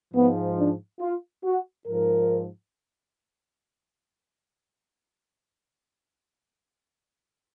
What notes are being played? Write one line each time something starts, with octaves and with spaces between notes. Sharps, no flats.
G#2 F3 B3
D4
F4
F#4
G#2 F3 A#4